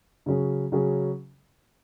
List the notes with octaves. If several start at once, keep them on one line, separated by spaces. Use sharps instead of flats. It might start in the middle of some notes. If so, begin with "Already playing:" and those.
C#3 F#3 C#4 G#4
C#3 F#3 C#4 G#4